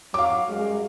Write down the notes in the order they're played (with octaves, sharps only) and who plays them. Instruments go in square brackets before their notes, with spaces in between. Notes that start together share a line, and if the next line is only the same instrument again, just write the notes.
[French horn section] F#3 [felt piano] F5 D6
[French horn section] F#2 G3 G#3